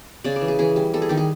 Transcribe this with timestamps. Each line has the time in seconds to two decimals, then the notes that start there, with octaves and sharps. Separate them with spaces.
0.24 C#3 D5
0.36 D5
0.41 E3
0.48 G#4
0.59 E3 G#4
0.76 G3
0.94 G3 A4
1.02 G#4
1.09 D#3 G4
1.17 G#4